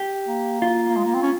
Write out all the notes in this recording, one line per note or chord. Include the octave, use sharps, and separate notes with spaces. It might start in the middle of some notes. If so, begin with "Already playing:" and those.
Already playing: G4
A#3
F4
A#3
G#3
A#3
C4
C#4